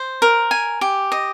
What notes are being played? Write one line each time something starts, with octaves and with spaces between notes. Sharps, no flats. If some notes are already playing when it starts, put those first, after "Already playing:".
Already playing: C5
A#4
G#5
G4
D#5